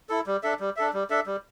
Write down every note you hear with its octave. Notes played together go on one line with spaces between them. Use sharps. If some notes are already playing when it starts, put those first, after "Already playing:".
E4 A4
G3
D4 A4 E5
G3
D4 A4 E5
G3
D4 A4 E5
G3